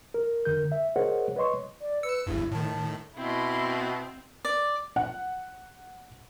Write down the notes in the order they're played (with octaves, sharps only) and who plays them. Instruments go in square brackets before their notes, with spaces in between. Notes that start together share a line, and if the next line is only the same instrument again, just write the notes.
[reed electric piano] A#4
F2 D3 A#4 G6
E5
G#4 A#4 C5 C#5 D#5 F#5
B4 C#5 D#5 C6 C#6
[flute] D5
[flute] B4 [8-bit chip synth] E6 C#7
[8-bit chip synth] G1 E2 G2 [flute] E4
[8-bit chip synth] A2 D#3 [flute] A5
[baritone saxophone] B2 [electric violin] C4 [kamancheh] E4 C6
[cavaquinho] D5
[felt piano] F#5